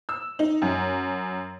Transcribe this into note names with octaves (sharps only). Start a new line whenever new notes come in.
E6
D#4
F#2